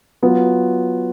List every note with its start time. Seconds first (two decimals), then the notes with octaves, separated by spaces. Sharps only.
0.22 F#3 B3 F4